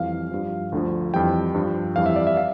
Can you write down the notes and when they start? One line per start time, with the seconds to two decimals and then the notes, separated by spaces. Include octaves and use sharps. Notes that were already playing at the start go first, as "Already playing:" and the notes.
Already playing: F2 E3 G3 F5
0.31 G2 F3
0.72 D2 D3 F3
1.14 F2 E3 G3 G5
1.54 G2 F3
1.96 F2 E3 G3 F5
2.06 E5
2.16 D5
2.27 E5
2.37 F5